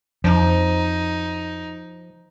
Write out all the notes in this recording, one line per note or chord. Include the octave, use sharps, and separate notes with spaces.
F2 F3 D#4